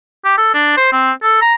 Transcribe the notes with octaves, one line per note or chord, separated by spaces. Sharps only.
G4
A4
D4
C5
C4
A4
A#5